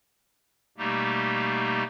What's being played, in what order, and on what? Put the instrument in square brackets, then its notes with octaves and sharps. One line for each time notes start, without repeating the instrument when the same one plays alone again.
[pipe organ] B2 G3 A3 A#3 D#4 G4